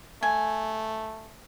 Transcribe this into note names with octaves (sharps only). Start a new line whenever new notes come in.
A3 G#5